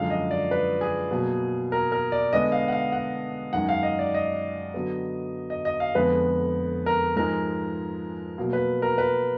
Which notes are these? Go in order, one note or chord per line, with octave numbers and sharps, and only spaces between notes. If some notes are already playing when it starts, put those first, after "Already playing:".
Already playing: F#2 D3 F3 G#3 F5
D#5
D5
B4
G#4
B2 F#3 A#3
A#4
A#4
D5
D3 G#3 B3 D#5
F5
F#5
F5
F#5
F#2 D#3 G#3 F#5
F5
D#5
D5
D#5
D3 F#3 B3
D#5
D#5
F5
F2 D3 G#3 B3 B4
A#4
G#2 F3 G#3 A#4
B2 F#3 A#3
B4
A#4
B4